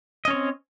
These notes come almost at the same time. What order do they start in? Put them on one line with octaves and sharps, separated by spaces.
D#5 C#4 C#5 C4